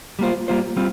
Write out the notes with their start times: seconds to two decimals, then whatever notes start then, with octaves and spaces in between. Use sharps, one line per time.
0.19 G3 A#3 F4 C5
0.48 G3 A#3 F4 C5
0.76 G3 C4 F4